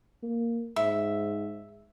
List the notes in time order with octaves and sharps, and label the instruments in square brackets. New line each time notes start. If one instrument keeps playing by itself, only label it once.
[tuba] A#3
[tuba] G#2 [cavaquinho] E5